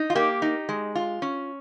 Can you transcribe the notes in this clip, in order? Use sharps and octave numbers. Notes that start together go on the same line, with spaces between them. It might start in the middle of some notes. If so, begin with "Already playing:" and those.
Already playing: D#4
F4
A#3 G4
D#4
G#3
F4
C#4